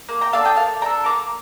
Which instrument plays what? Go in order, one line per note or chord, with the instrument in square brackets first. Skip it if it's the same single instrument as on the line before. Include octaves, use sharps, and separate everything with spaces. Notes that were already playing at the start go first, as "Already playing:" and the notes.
[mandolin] A#3
G5 A#5
D4 A4 F5 A5
D#5 G5
A#3 F5 A5
D4 G5 A#5
A4
A#3 A#5 D6